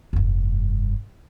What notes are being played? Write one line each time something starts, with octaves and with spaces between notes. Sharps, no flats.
F1 G2